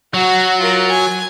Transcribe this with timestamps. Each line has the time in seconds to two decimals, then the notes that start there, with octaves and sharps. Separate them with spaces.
0.14 F#3 F#4
0.60 F4 A#4
0.90 G#5